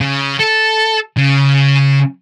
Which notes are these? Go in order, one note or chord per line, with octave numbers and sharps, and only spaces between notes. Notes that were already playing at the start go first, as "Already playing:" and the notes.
C#3
A4
C#3